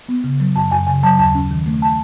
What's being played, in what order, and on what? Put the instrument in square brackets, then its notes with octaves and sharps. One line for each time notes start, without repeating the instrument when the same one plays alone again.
[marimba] B3
C#3
F#3
F#2 A5
F#2 G#5
C#3 G#5
F#3 A5
D#2 A5
C#4
D#3
A3
A5